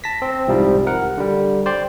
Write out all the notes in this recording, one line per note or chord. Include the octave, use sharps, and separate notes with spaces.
A5 A#6 B6
C4
C2 G#2 C3 F3 G3
A#4 F#5
D3 G3
C5 D5 G5 C6